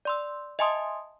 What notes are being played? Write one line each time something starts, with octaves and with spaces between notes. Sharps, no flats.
D5 C6 E6
D#5 E5 G#5 A5 C6 D#6